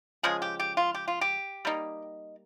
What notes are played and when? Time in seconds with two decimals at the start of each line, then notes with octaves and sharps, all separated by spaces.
0.23 C#3 F3 G#3 G#4
0.42 G4
0.60 G4
0.77 F4
0.95 G4
1.08 F4
1.21 G4
1.65 G3 A#3 D#4